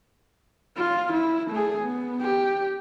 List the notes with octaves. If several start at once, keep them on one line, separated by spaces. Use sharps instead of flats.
F4
E4
A3 G#4
B3
G4